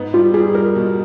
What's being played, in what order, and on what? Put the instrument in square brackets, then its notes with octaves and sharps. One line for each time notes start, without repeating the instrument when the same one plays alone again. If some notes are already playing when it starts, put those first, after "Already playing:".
Already playing: [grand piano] G#2 B3
[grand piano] G3 [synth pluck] F4
[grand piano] G3 [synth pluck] G#4
[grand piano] G3 [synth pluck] A#4
[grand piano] B2